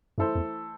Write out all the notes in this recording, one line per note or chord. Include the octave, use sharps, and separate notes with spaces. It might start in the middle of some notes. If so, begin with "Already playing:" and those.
F#2 E3 A3 E4 A4 C5
E2